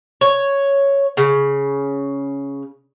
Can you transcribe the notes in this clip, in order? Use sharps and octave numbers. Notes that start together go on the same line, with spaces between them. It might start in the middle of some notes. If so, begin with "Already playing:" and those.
C#5
C#3